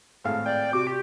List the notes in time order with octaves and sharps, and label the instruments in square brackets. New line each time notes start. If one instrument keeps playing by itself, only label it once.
[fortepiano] G#1 A2 F5
[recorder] D5 [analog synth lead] G5
[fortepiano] C3 [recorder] F#4 [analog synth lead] D6
[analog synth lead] G4